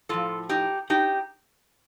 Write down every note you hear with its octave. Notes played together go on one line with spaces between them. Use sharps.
A2 F3 F4 A4
D#4 G4
D#4 G4